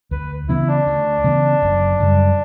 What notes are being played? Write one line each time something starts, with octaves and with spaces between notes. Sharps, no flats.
D2 B4
C#3 E3 B3 E4
D4
D2
C#3 E3 B3
F#1
F#2 C#3 G3